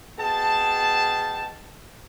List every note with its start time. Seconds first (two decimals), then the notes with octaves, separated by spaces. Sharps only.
0.18 B2 G#4 G5 A5